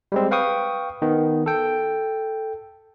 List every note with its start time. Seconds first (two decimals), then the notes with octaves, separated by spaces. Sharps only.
0.12 G3 G#3 C4
0.31 B4 F5 G5 C#6 D#6
1.02 D#3 B3
1.46 A4 G5